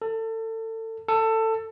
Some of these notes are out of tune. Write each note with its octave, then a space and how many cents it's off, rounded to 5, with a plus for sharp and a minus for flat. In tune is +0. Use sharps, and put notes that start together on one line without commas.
A4 +30
A4 +20